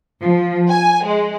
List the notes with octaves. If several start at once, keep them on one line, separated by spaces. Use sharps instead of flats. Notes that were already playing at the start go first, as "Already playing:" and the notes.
F3
G#5
G#3